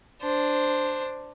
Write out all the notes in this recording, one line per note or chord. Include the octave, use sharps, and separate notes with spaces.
D4 C5